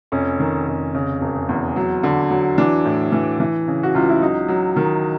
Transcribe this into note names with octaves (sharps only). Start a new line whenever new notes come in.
F1 C#4
D#3
F1
C#3
E1
E2
F#3
D3
F#3
E3 D4
A2
E3
E3
C#3
F#4
C#2 F4
E4
F#3 D#4
F#3
D#3